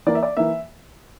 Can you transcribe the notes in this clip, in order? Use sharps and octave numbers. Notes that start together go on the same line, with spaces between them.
E3 A#3 D5
E5
D5
E3 A#3 E5